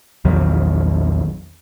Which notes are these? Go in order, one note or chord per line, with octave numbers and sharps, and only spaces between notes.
A#1 E2 D#3 F#3